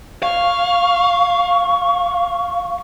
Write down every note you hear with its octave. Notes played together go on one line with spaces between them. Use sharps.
F5 C#6